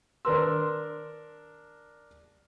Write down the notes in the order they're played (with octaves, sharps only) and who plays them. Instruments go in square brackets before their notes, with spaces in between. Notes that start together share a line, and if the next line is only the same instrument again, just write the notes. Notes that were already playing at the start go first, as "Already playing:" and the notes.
[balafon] D#3 B4 C6 [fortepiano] D4 A#4 E6